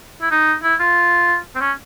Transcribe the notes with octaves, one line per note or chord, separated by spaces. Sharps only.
E4
D#4
E4
F4
C4
C#4